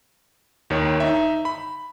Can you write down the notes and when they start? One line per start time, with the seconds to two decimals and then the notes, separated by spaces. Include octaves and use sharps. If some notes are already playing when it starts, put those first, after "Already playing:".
0.70 D#2 D#3 C#5
1.00 D#4 E5
1.45 B5